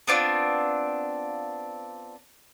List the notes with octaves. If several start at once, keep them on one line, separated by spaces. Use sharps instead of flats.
B3 C4 D4 F4